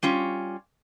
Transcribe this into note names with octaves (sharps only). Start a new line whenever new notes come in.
G3 C#4 F4